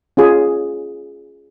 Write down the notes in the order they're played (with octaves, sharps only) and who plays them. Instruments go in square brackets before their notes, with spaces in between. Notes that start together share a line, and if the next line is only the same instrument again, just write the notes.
[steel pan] C#4 F4 G#4